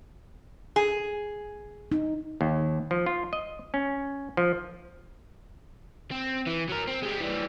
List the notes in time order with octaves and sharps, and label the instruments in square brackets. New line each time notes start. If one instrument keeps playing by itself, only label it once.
[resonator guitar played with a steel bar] G#4
[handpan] D#4
[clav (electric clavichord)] D#2
F3
F4
D#5
C#4
F3
[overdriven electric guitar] C4
E3
F#3 A#4
C4
G3 G#3
E3 G3